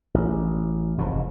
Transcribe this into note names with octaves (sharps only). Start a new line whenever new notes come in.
A1
F1 F2 G#2